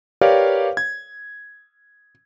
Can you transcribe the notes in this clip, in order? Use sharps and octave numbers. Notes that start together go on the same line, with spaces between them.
G4 A#4 B4 C#5 D5 F5
G#6